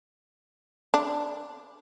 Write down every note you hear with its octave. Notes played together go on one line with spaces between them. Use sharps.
D4